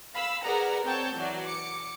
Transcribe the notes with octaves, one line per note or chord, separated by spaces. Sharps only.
F5 B5 E6
G#4 A#4 B4 D5 F#5 A#5
C4 C#5 G5 A5 G6
E3 F#3 F#4 D5
D6 C#7